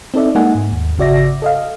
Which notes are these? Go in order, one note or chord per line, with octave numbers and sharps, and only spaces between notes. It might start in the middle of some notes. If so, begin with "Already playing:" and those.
C4 D#4 A4 D5 E5
G#3 A#3 D#4 F#5 G#5
G#2
D#2
G#1 C#3 F#4 D5 E5 A#6
A4 D#5 F5